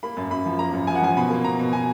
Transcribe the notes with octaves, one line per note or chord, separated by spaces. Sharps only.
A#3 B5
F#2
F#2 B5
F3
A#3 A#5
F#2
F3 G#5
F#5
F3 G#5
B2 B5
A#3
B2 A#5
B2
B2 G#5